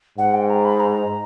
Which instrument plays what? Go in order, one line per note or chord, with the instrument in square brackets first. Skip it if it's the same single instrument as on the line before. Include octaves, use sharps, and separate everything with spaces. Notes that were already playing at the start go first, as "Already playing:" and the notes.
[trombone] G#2 [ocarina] F#5
[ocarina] G5
A#5
B5
A#5